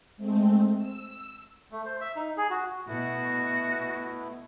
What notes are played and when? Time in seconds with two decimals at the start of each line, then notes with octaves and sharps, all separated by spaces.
0.17 G#3 A3 C4
0.77 E6
1.72 A3
1.85 C5
2.01 E5
2.16 D#4
2.38 G#4
2.50 F#4
2.88 B2 A3 B3 E4 F#4